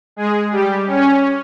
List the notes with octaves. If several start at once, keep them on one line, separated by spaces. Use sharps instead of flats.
G#3 G#4
G3 G4
C#4